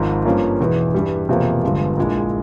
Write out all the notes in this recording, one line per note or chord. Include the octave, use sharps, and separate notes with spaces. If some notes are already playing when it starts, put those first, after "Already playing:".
Already playing: G#1 G#2 F3
G2 F3 A#3 C#4
E1 E2 E3
G2 E3 G3
E1 E2 C3 F3 A#3
G1 G2 F3 G#3
A#1 A#2 G#3 E4